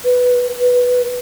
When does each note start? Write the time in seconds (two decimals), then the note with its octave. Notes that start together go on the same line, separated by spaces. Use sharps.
0.05 B4
0.61 B4